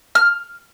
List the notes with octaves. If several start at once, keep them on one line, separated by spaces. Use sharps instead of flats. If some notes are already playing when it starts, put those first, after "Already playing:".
F6